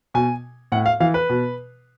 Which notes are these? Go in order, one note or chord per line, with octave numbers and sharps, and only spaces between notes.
B2 G#5
A2 F#5
F5
E3 F5
B4
B2